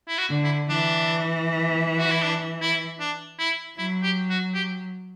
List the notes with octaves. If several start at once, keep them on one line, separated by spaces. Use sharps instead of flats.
E4
F#4
D3
E4
E3 D4
F#4
E4
D4
E4
D4
E4
F#3 E4
G4
F#4
G4